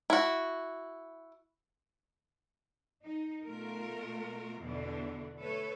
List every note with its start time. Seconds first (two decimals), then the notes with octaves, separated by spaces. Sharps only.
0.10 E4 F#4
3.04 D#4
3.45 B2 A3 F4 A#4
4.61 E2 B2 D3 E3 D4
5.38 A3 A4 B4 C#5